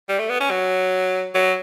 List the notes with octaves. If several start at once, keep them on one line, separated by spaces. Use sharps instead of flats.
G3
A3
B3
C#4
F#3
F#3